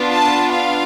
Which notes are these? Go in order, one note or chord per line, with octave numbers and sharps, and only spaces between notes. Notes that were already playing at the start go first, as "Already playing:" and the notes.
Already playing: B3 D4 F4
A5
F5